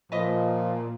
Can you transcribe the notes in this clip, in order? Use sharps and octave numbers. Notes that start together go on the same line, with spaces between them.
A#2 F3 B4 D#5